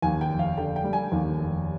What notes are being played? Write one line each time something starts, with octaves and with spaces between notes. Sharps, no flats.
D#2 G#5
G5
F1
F5
D3 G5
G5
G3
G#5
D#2
F1